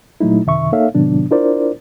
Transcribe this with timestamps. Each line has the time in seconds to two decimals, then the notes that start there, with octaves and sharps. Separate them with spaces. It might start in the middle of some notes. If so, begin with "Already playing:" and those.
0.20 A#2 F#3 A3 D#4 E4
0.45 F#2 C3 D#3 E5 C#6
0.72 A#3 D#4 A4 C#5 E5 F5
0.95 A2 C3 D#3 F#3 B3 D4
1.31 D4 E4 F4 A#4 C5 D5